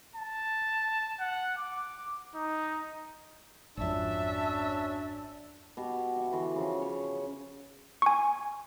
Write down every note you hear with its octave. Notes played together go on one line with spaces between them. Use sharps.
A5
F#5
D6
D#4
G#1 F2 C#4 D4 F#4 E5 A5
B2 F#4 G4
E5 C#6
D3 E3 F#4 C6
C#3 F3
C#5
G#5 C#6